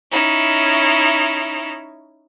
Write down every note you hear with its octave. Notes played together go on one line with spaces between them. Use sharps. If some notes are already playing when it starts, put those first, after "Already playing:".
C#4 D#4 E4